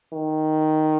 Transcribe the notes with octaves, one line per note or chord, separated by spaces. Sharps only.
D#3